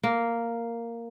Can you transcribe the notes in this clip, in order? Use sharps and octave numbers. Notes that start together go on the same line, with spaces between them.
A#3